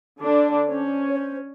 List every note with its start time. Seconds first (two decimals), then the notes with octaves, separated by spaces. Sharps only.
0.21 D3 D4 D5
0.69 C#4 C5
1.10 C#5
1.16 C5